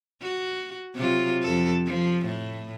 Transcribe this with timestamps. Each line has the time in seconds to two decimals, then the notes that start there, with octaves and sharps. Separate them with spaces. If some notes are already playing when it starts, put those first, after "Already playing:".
0.21 F#4
0.95 C3 F#3 F4
1.43 F2 A4
1.86 F3
2.26 A2